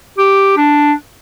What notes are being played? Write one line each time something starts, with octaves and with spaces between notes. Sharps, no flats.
G4
D4